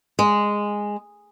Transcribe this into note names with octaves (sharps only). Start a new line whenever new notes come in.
G#3